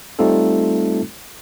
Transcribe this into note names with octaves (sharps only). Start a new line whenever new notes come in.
G3 A3 C4 D#4 F4 A4